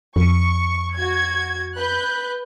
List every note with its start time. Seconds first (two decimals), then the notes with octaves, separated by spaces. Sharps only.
0.16 F2 C#6
0.94 F#4 G#6
1.76 B4 F#6 G6